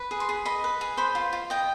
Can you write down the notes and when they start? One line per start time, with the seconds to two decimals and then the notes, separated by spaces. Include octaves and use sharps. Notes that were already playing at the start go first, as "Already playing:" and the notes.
Already playing: B4
0.11 G#4
0.20 C6
0.29 G#4
0.45 D#5 B5
0.64 B4
0.81 G#4
0.97 C5 B5
1.15 F4
1.33 F4
1.50 D#5 G5